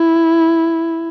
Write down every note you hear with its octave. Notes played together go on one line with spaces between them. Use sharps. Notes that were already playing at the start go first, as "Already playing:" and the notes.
Already playing: E4